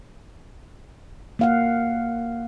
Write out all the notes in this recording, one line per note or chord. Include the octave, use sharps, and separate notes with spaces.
A#3 F5 F#5